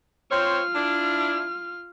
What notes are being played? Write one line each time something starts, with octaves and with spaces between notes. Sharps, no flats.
C4 F4 C5 C#5 F6
D4 E4